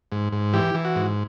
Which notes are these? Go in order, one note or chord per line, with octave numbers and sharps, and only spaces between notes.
G#2
G#2
E3 G4
E3
F#4
G#2